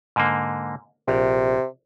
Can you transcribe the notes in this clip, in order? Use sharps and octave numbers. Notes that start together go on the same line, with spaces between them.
G#2 D3 A#3
A#1 C3